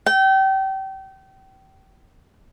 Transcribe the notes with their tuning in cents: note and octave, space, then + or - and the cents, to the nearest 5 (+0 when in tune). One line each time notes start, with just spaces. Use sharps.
G5 -30